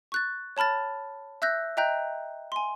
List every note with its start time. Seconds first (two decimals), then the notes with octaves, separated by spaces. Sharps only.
0.12 C#6 F#6 A6
0.57 C#5 A5 B5 F6 A6
1.42 E5 E6 F#6 G6 A#6
1.77 D#5 E5 G5 A#5 F#6 G6
2.52 G#5 C6